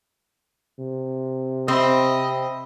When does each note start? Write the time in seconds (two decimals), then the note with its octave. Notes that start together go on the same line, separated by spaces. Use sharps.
0.79 C3
1.68 C4 D#5 E5 B5 E6